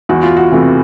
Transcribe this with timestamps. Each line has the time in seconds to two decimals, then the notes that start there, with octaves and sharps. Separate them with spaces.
0.09 E2 F#4
0.23 F4
0.37 F#4
0.51 C3 E3 A3